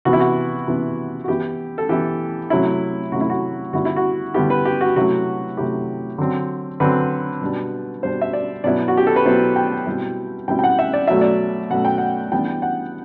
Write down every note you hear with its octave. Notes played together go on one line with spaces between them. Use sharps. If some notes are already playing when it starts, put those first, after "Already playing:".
C3 E3 B3 F#4
E4
F#4
C3 E3 B3
F#4
E3 B3 E4 G4
A4
E3 B3 E4 G4
C3 F#3 A3 E4
C3 F#3 A3 F#4
E4
F#4
D3 G3 B3 E4 F#4
E4
F#4
D3 G3 B3 E4 G4
B4
G4
F#4
C3 F#3 A3 E4 F#4
C3 F#3 A3 E4 G4
D3 F#3 C4
D3 F#3 C4 B4
B2 G3 D4
B2 G3 D4 C5
E5
D5
B2 F#3 B3 E4 D5
F#4
G4
A4
B4
B2 F#3 B3 E4 C5
G5
B2 G3 C4 E4
B2 G3 C4 E4 G5
G5
F#5
E5
D5
B2 F#3 A3 E5
D5
B2 F#3 A3 F#5
G5
F#5
E3 G3 B3 D4 G5
F#5